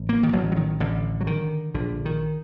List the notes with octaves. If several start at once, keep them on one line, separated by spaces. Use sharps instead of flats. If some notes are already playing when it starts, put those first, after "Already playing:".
Already playing: A1
A#3
D#3
A1 F#3
F#3
D#3
A1 D3
F#3
D3 D#3
A#1 D3
D#3